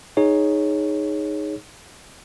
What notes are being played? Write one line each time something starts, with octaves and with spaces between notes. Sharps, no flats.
D#4 G#4 C#5